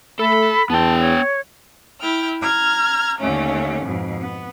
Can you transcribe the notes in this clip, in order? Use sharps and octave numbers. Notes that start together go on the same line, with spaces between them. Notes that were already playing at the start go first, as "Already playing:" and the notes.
A3 A4 B5
E2 B3 G5 A5
C#5
E4 G5 F6
A#5 F6 G#6
D#2 D3 A3 C#4
F2 G#2 B2
B3